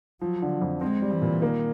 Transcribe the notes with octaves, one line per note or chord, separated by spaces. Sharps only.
F3 F#3
D3
F2
G#3 C4
G3
E3
A#2
D#3 A#3